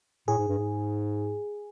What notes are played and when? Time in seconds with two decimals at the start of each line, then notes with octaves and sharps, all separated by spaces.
0.28 A2 G#4
0.38 G#2
0.48 G2
0.58 G#2